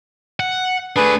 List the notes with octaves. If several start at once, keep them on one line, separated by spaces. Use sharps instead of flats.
F#5
A3 D4 G#4 B4